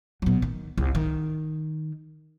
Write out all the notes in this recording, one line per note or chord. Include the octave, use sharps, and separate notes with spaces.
B2 F#3
D#3
C2
D#3